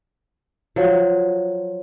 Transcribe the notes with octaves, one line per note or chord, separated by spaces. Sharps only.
F3 F#3